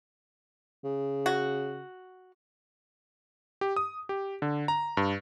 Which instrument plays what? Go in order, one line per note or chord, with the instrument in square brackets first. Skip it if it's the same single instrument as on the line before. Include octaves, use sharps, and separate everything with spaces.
[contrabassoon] C#3
[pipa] F#4
[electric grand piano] G4
D#6
G4
D3
A#5
G2